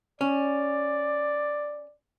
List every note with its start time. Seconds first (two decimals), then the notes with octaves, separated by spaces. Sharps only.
0.21 C#4 D5